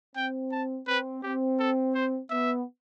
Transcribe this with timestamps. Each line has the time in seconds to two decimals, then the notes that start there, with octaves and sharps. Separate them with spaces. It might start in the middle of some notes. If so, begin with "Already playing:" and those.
0.16 C4 G5
0.52 A5
0.88 C4 B4
1.23 C4 G4
1.60 A4
1.95 C5
2.30 B3 E5